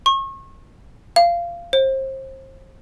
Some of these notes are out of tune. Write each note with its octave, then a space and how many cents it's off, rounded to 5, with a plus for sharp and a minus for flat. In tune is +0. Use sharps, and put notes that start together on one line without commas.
C#6 -35
F5 -20
C5 +30